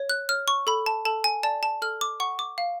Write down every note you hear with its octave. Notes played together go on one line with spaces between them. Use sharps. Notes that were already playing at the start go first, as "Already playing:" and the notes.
Already playing: C#5
F#6
C#5 F6
C#6
A4 B5
A5
A4 A5
G#5
D5 A5
A5
A4 F6
D6
F#5 C#6
D6
F5